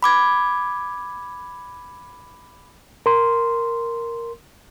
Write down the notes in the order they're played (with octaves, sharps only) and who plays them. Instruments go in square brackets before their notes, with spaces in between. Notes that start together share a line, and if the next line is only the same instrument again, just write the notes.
[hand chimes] B5 D6 G#6
[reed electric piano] A#4 C6